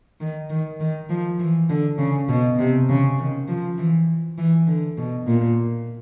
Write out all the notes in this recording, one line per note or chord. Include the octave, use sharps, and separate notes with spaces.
D#3
D#3
D#3
F3
E3
D3
C#3
B2
C3
C#3
D#3
F3
E3
E3
D3
B2
A#2